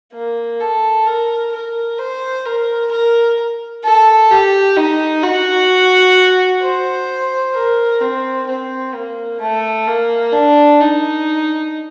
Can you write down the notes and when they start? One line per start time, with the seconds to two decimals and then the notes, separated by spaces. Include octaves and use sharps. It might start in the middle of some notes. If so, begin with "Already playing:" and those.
0.13 A#3
0.60 A4
1.06 A#4
1.52 A#4
1.98 C5
2.45 A#4
2.91 A#4
3.84 A4
4.31 G4
4.76 D#4
5.23 F#4
6.62 C5
7.54 A#4
8.01 C4
8.47 C4
8.94 A#3
9.40 A3
9.87 A#3
10.32 D4
10.80 D#4